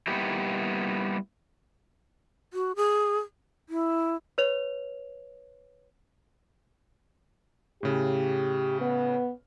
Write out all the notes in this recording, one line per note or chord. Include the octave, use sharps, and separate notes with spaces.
G3 A#3 B3 D#4 E4 G4
F#4
G#4
E4
B4 C#5 F7
A2 C#3 G4
B3